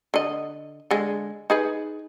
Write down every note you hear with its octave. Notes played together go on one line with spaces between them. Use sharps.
D3 D#5
D3 G#3
D#4 G#4 B4